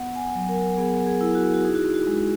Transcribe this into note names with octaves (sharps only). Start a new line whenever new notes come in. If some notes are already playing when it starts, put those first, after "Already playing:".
Already playing: B3 F#5
G#5
F#5
F#3
A#4
B3 G#4
G#4
E4
F#4
F#4
D#4 G#4
F#4
F#4
G#3